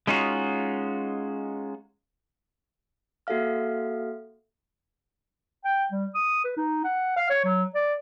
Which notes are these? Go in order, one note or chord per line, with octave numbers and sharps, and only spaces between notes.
G#3 C#4 D#4 F4 F#4
A#3 F#4 A4 E5 F5 F6
G5
G3
D#6
B4
D#4
F#5
F5
C#5
F#3
D5